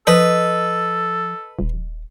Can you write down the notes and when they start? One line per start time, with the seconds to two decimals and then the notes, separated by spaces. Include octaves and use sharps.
0.07 F3 A4 B4 D#5
1.59 D#1